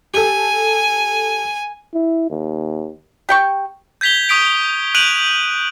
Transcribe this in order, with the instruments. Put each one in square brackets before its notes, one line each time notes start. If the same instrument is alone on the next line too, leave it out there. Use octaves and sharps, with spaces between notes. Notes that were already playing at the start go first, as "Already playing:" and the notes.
[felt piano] G4 A4 [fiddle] G#5
[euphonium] E4
D#2
[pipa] G4 G5 C#6
[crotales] G6 G#6 B6 F7 G7
C#6 D#6 B6 D7 F7
F#6 G6 D7 D#7 F7 F#7